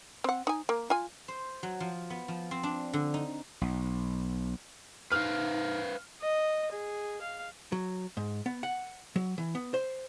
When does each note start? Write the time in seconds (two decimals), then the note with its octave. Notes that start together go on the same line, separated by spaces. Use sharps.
0.24 C4 F#5
0.47 D#4 G#5
0.69 A#3
0.90 F4 G#5
1.28 C5
1.63 F#3
1.80 F3
2.10 B3
2.28 F3
2.51 C4
2.63 D4
2.93 D3
3.14 D#4
3.61 B1
5.12 D#4 B4 C5 F5 F6
6.21 D#5
6.72 G#4
7.21 F5
7.72 F#3
8.17 G#2
8.46 B3
8.63 F#5
9.16 F#3
9.38 E3
9.55 B3
9.74 C5